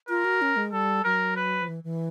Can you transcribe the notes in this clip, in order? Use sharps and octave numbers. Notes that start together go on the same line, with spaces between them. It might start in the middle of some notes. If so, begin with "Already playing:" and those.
F4 A#4
F#4
C#4
G#3
G3 A4
F#3 A#4
B4
F3
E3
E3